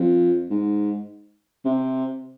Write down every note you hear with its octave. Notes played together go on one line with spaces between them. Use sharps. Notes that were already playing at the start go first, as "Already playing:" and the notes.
Already playing: F2
G#2
C3